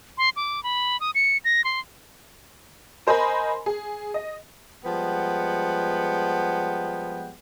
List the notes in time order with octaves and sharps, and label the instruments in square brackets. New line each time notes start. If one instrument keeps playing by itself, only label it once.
[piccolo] C6
D6
B5
D#6
C#7
A#6
C6
[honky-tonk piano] A#4 C5 D#5 G#5 B5
G#4
D#5
[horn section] F3 G3 G#3 B3 F#5 G5